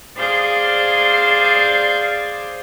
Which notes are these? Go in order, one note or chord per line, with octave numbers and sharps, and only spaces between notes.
G#4 C5 D5 F5 G6 A6